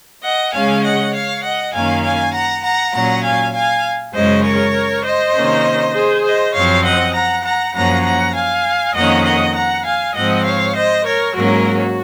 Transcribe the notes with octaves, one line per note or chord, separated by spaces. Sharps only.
D#5 F#5
C#3 G#3 C#4 F5 G#5
D#5 F#5
C#5 F5
D#5 F#5
F#2 D#3 A#3 C#4 F5 G#5
F5 G#5
F#5 A#5
F#5 A#5
A#2 F#3 C#4 F#5 A#5
F5 G#5
F5 G#5
F#2 C#3 G#3 C#4 C5 D#5
A#4 C#5
C5 D#5
C3 D#3 A#3 C#4
G#4 C5
C5 D#5
F#2 F3 C4 C#5 F5
D#5 F#5
F#5 A#5
F#5 A#5
F#2 F3 A#3 C#4 F#5 A#5
F#5 A#5
F5 G#5
F2 D#3 A#3 C#4 D#5 F#5
D#5 F#5
F#5 A#5
F5 G#5
G#2 F3 C4 D#5 F#5
C#5 F5
C5 D#5
A#4 C#5
G#2 F#3 A#3 C#4 F#4 A#4
F#4